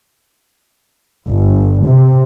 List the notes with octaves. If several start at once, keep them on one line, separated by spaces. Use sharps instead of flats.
G1
C3